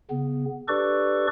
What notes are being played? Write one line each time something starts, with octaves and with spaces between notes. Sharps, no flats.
C#3 B3
D4 G4 A4 B4 D5 C#6